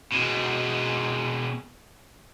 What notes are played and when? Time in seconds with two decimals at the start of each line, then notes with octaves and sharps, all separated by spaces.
0.12 B2 G#3